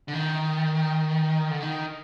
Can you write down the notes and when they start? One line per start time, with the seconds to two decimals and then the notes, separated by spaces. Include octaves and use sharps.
0.08 D3
0.14 D#3
1.50 D3
1.63 D#3